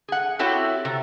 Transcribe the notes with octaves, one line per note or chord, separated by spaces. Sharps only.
G#4 F#5
C4 E4 F#4 G4 A4 C#5
C3